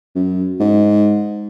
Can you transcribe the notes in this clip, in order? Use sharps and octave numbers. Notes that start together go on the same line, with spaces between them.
F#2
G#2